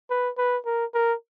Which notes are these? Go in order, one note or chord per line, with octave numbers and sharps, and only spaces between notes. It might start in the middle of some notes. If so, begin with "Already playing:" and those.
B4
B4
A#4
A#4